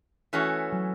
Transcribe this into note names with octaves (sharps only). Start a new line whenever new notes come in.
E3 A3 C#4 F#4
F#3